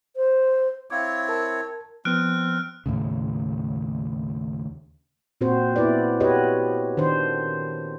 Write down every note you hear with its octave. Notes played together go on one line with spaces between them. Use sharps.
C5
C4 E4 C#5 F5 D6
A#4 A5
F3 B3 C4 F6 F#6 D7
D#2 A2 C#3
A#2 C4 F#4 C5
B3 E4 B4 D5
F#4 G4 B4 C#5 D#5
D#3 D4 C5